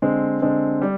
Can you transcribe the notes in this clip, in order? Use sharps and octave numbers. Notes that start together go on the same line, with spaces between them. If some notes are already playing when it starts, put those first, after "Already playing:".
D3 G#3 C4
D3 G#3 C4
G3